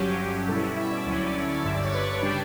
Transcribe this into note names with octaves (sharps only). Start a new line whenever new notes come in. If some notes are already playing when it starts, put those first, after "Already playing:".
Already playing: G1 G2 F#3 C#4 G4
B2 G3 C#4 E4 A4
E5
D5
D2 D3 F#3 C#4 E4 C#5
D5
C#5
D5
G1 G2 D3 E5
D5
C#5
B4
B4
C#3 G3 D4 G4